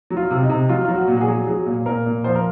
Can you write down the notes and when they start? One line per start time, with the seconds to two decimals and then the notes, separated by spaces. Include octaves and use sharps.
0.10 F#3
0.17 F4
0.31 C3
0.43 D#4
0.49 C3
0.69 F#3 F4
0.85 F#3 F4
0.95 F#4
1.08 A#2
1.17 F#4
1.21 G#4
1.28 F#3
1.47 F#3 G#4
1.66 A#2
1.86 A#2 A#4
2.06 A#2
2.24 F3 C5
2.35 A#4